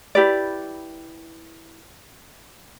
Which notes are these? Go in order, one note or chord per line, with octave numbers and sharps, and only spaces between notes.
E4 G4 B4 D5